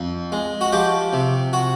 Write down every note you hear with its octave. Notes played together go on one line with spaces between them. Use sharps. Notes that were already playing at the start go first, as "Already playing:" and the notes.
Already playing: F2
G#3
F#4
F3 G4
C3
F#4